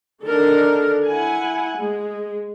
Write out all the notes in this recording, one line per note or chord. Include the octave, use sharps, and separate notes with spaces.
D3 D#3 D4 A4 A#4
E4 F#5 G#5
G#3